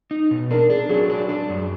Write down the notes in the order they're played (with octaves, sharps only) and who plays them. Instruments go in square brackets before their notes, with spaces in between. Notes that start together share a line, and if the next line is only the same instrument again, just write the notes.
[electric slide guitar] D#4
B2
[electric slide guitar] D4 [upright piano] A#4
[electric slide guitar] D4 [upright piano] G#4
[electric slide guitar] F#3 [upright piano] G#4
[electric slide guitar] D4
D4
F#2